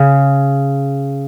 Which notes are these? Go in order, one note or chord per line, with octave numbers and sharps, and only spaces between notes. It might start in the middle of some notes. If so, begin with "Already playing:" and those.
Already playing: C#3